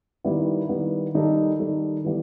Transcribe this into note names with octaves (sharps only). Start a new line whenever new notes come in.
D#3 G3 B3 E4
D#3 G3 B3 E4
D#3 G3 D#4 A4
D#3 G3 D#4 A4
E3 G3 B3